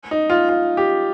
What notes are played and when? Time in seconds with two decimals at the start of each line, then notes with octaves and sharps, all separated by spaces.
0.11 D#4
0.30 F4
0.49 F4
0.77 G4